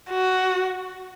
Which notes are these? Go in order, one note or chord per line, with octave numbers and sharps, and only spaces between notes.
F#4